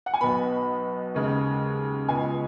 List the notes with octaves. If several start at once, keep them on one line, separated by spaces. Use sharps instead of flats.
F#5
G#5
B1 B2 B3 B5
D#2 C#3 G#3
C#2 B2 G#3 G#5